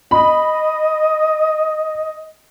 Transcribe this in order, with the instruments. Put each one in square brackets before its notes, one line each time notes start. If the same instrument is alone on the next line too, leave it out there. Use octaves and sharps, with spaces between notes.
[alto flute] D#5 [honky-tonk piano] B5